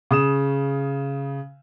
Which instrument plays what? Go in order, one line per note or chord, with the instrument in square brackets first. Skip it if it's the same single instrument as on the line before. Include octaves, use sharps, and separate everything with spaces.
[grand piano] C#3 D#6 E7